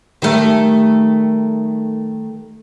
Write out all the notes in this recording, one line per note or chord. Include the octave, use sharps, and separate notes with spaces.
D#3 G3 A3